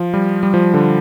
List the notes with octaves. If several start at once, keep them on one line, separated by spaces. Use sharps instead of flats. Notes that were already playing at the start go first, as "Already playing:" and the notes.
Already playing: F3
G3
G3
F3
D3